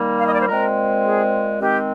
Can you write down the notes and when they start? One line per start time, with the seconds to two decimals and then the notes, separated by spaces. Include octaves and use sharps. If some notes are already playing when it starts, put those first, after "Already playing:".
Already playing: D#3 G3 A#3
0.19 F5
0.26 D#5
0.34 D5
0.41 C5
0.48 A#2 G#3 C4 A#4
1.04 G#4
1.61 D#3 G#3 C4 G4